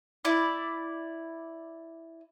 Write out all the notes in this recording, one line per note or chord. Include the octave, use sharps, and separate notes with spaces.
E4 D5